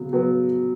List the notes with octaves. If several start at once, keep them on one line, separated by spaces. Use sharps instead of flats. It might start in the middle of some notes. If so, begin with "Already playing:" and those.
Already playing: C#3 F#3 B3
F#3 B3